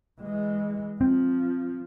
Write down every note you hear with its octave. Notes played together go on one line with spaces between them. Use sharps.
E3 G#3
F3 C4